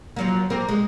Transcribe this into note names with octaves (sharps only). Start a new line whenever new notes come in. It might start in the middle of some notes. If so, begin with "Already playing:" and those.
F3 F#3 A#3
A#3 C4 A#4
G#3